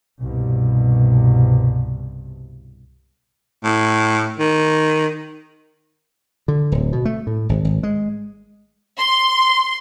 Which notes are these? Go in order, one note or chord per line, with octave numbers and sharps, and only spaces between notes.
C2 G2 B2
A2
D#3
D3
D1
B2
A3
A2
G#1
G#1
G#3
C6